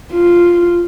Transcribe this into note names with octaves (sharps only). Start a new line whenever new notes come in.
F4